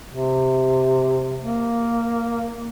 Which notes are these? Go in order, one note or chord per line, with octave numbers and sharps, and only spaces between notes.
C3
A#3